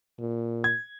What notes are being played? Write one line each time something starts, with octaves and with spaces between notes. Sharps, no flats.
A#2
G#6